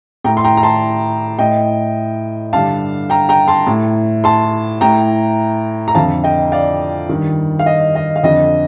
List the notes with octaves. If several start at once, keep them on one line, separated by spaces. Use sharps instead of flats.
A2 G5 A#5
C6
G5 A#5
A#5
A5 C6
A2 D#5 G5
G2 D3 F5 A5
G5 A#5
G5 A#5
A5 C6
A2
A5 C6
A2 G5 A#5
A#5
F2 D3 F5 A5
D#5 G5
D5 F5
G2 D#3
F5
D#5
D#5
F5
F2 D3 D#5